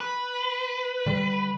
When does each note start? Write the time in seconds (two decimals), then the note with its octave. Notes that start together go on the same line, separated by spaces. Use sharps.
0.01 B4
1.06 D3 G3